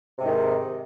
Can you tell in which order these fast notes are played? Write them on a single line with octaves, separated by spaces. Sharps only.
C3 G#2 D#3